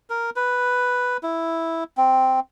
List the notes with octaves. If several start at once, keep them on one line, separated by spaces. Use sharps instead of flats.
A#4
B4
E4
C4